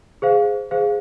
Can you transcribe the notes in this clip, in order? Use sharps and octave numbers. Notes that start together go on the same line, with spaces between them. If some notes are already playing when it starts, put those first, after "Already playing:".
G#4 C5 F5
G#4 C5 F5